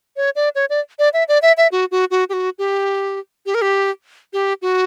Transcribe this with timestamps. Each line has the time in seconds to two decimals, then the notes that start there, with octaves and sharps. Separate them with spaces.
0.17 C#5
0.36 D5
0.55 C#5
0.70 D5
0.99 D5
1.13 E5
1.28 D5
1.42 E5
1.57 E5
1.72 F#4
1.91 F#4
2.11 F#4
2.29 G4
2.33 F#4
2.59 G4
3.46 G4
3.55 A#4
3.62 G4
4.33 G4
4.62 F#4